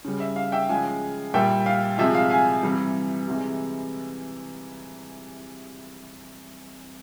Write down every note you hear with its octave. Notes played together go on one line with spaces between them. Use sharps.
C#3 G3
E5
F5
E5 G5
C#3 F3 G#3 F5 G#5
A#2 G3 E5 G5
F5
C3 F3 G#3 E5
F5
F5 G#5
C3 E3 G3
C3 E3 G#3